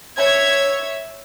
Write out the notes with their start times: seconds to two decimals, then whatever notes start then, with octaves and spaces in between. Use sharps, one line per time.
0.17 C#5 E5 G#6